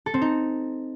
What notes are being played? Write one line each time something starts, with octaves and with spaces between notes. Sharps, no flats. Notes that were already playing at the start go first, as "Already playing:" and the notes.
A4
C4
D#4